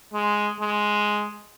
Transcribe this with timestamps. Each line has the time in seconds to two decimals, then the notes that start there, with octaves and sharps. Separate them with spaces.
0.14 G#3
0.61 G#3